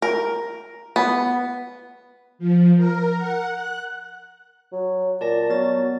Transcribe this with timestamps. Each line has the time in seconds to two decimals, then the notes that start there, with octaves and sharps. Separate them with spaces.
0.02 A#4
0.96 B3
2.39 F3
2.76 A#4
3.18 F#5
3.52 F#6
4.73 F#3
5.21 A#2 D5 A5 A#6
5.50 F#3 B3 A6